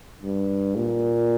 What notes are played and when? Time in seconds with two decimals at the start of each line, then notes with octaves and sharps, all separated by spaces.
0.23 G2
0.77 A#2